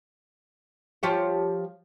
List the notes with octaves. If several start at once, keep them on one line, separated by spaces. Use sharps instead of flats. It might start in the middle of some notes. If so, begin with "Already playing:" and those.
F3 G4 C#5